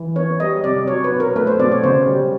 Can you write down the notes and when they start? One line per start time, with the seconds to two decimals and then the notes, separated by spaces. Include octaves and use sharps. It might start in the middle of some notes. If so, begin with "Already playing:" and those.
Already playing: E3
0.16 B3 C#5
0.40 G3 D#5
0.64 C3 D5
0.88 F#3 C#5
1.04 B4
1.12 B2
1.20 A#4
1.36 A3 B4
1.47 C5
1.59 B2 D5
1.72 C#5
1.84 C#3 C5
2.07 G3